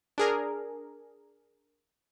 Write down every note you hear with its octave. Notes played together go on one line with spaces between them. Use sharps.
D4 G#4 A#4